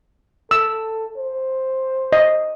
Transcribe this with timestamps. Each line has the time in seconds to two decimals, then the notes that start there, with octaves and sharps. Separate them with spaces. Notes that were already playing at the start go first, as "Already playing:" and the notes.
0.51 A4 E6
1.17 C5
2.13 D#5